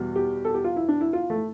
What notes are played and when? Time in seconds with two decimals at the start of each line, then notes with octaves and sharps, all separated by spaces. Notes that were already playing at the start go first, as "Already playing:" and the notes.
Already playing: E2 B2 G3
0.15 G4
0.45 A4
0.54 G4
0.64 F4
0.76 E4
0.89 D4
1.01 E4
1.13 F4
1.30 A3